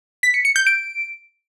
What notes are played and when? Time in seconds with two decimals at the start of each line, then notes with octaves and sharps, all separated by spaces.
0.23 B6
0.34 C#7
0.45 C#7
0.56 G6
0.67 D7